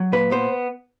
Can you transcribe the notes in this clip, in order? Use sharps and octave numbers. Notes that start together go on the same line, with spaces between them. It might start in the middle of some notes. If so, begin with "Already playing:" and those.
Already playing: F#3
A#2 B4
B3 C5